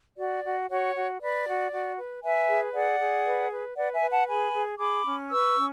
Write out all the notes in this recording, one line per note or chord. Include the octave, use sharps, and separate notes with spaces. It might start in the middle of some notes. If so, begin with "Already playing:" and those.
F#4 D5
F#4
F#4 C#5
F#4
B4 D5
F#4
F#4
B4
B4 E5 G#5
G#4
G#4 D5 F#5
G#4
B4
B4
B4 D5 F#5
E5 G#5
B4
F#5 A5
G#4 G#5 B5
G#4
G#4 B5 D6
C#4
B4 C#6 E6
C#4